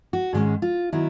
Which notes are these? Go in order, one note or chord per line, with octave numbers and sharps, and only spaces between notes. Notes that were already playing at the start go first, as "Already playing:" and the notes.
F#4
G#2 D#3 G#3 C#4
F4
D#3 F#3 B3 E4